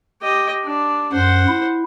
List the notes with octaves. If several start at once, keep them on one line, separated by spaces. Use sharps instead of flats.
G4 D#5
D4
F#2 C5 F#5
E4